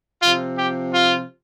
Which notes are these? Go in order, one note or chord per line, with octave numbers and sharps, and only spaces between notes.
C3 F3 C4 F4
G4
F4